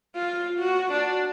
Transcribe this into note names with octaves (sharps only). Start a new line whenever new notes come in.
F4
F#4
D4